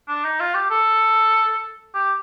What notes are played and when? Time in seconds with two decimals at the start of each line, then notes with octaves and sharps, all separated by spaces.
0.08 D4
0.24 D#4
0.40 F4
0.55 G4
0.70 A4
1.94 G4